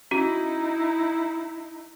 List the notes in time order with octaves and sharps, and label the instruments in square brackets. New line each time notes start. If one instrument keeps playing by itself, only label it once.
[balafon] C#4 F#4 [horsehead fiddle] D#4 E4